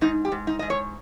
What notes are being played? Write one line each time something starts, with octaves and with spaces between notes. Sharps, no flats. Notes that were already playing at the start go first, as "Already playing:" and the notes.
G#2 D#4
G4
G#2
D#4
G#2 D#5
C#5